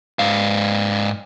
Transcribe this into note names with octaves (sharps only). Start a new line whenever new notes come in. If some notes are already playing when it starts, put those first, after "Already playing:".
G#2 F5